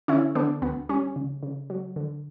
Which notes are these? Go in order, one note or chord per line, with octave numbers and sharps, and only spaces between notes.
D3 C#4 E4
D3 B3 D4
D2 B3
G3 C#4
C#3
C#3
F#3
D3